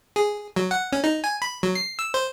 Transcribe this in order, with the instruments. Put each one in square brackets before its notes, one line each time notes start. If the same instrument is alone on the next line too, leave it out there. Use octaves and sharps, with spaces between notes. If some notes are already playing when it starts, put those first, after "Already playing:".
[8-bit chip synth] G#4
F#3
F#5
C#4
D#4
G#5
B5
F#3
C7
E6
C5